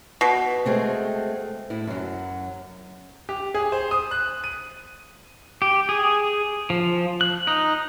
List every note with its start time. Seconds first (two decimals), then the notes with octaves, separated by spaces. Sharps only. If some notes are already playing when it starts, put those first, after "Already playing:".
0.21 B2
0.66 G#3 A3 C4
1.70 A2 E4
1.87 F#2 F#3
3.29 G4
3.55 G#4
3.72 C5
3.91 D#6
4.11 F#6
4.44 D#7
5.62 G4
5.89 G#4
6.70 F3
7.21 F#6
7.47 D#4